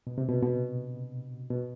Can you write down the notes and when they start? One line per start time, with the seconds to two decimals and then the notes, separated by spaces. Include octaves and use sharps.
0.07 B2
0.18 C3
0.28 B2
0.43 B2
1.50 B2